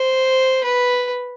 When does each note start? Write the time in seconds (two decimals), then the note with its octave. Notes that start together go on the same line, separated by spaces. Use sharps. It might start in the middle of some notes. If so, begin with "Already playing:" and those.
Already playing: C5
0.64 B4